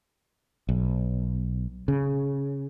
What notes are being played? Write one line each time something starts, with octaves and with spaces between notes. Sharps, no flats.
B1
C#3